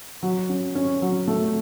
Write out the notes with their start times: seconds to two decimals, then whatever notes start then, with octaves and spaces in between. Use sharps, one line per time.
0.23 F#3
0.49 C#4
0.75 C#4
1.02 F#3
1.28 A3